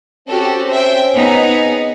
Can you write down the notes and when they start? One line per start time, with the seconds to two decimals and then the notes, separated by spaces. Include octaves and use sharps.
0.28 C4 C#4 F#4 G4 A4
0.69 C5 E5 G5
1.14 B3 D#4 G#4